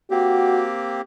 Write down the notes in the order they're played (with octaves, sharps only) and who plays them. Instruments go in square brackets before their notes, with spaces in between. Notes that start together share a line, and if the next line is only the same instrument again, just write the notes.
[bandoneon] A#3 C4 G4 [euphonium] F#4